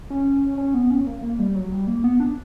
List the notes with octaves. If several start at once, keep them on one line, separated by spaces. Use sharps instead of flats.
C#4
C#4
B3
C#4
A#3
A#3
G3
F#3
G3
A#3
B3
D4